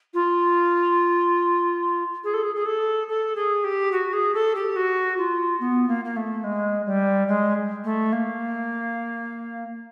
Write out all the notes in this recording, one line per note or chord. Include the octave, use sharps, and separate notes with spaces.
F4
G#4
A4
G#4
G#4
A4
A4
G#4
G4
F#4
G#4
A4
G4
F#4
F4
B3
A#3
A#3
A3
G#3
G3
G#3
A3
A#3